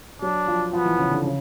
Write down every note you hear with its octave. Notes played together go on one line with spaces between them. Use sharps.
F#3 D4
F3
F3 B3
E3
C#3
D3
C#3